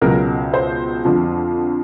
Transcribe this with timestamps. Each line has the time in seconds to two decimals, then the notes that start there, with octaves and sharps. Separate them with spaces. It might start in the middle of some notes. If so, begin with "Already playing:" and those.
0.01 C#2 B2 F#3 A#4
0.54 C5
1.05 F2 D3 F3